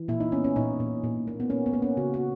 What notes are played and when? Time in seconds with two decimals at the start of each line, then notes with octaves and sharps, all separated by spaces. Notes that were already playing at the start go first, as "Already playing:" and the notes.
Already playing: E3
0.08 A#2 E4
0.20 D#4
0.32 B3 C#4
0.44 C#4
0.56 A#2 D#4
0.80 A#2
1.04 A#2
1.27 A#3
1.40 B3
1.50 A#3 C#4
1.66 B3
1.73 A#3
1.82 C#4
1.97 C#3 F#4
2.14 F#4